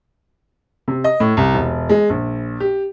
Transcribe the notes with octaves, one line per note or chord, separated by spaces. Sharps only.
C3
D#5
A2
C2
E1
G#3
A#1
G4